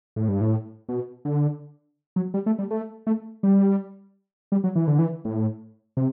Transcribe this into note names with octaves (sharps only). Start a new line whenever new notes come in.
A2
G2
A2
B2
D3
F#3
G3
A3
G3
A3
A3
G3
G3
F#3
E3
D3
E3
A2
C3